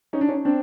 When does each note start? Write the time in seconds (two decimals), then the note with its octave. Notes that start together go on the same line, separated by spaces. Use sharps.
0.13 C#4 D#4
0.21 D4
0.29 C#4 D#4
0.45 C4 D4